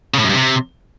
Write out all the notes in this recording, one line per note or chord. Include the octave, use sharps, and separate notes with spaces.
C#3
A2
F#2
G2
C3